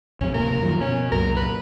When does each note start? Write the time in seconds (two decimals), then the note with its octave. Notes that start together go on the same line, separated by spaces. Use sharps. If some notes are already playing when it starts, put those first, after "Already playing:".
0.21 A#1 F2 C3 C#4
0.34 D1 C3 A#3 A#4
0.61 F#2 D#3 F3
0.81 B2 C#4
1.12 C2 F#2 A#2 A#4
1.36 B4